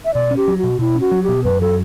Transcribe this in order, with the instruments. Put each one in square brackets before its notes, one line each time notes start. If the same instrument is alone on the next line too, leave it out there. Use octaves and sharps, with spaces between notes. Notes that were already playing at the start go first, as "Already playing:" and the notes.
[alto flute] E5
[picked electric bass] B2 [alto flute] D5
[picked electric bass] C#4
[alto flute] G4
[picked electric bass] F#3
[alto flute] F#4
[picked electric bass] B2
[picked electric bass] B2 [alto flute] E4
[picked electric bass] C#4
[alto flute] F#4
[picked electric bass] F#3
[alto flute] G4
[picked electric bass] B2
[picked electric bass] F#2 [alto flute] B4
[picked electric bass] F#3 [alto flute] A4